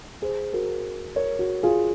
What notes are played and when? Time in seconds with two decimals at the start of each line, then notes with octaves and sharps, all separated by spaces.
0.22 G#4 C5
0.53 F#4 A#4
1.16 A#4 C#5
1.39 F#4
1.63 F4 G#4